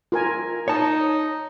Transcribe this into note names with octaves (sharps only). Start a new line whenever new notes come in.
F4 A#4 G#5
D#4 C#5 A5